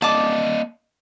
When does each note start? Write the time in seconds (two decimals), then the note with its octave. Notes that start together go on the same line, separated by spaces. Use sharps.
0.02 A#3 D5 D#5 A5 D6